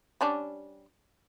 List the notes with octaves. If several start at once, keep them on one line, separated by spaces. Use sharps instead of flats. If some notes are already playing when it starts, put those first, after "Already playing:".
G3 C#4 D4